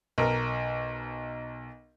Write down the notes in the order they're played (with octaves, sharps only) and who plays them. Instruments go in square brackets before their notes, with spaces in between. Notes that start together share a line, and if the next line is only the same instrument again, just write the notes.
[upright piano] B1 A#4